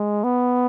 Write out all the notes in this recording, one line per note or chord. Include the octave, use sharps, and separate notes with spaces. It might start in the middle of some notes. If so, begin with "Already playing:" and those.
Already playing: G#3
B3